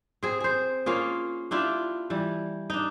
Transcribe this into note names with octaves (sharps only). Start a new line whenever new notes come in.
C4 G#4
G#4 C5
A#3 C#4 F4 G#4
D4 E4 F4 G4
E3 G3
D4 D#4